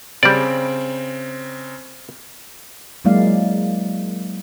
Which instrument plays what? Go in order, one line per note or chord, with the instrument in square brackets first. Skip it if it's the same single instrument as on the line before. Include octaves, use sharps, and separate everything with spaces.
[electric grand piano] C#3 C4 [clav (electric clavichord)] G3 D5
[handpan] F#3 G#3 A#3 E4 D5 F5